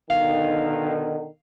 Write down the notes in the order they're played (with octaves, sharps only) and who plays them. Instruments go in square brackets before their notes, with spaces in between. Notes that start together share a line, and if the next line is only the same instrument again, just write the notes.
[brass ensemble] B2 D3 D#3 [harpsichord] F5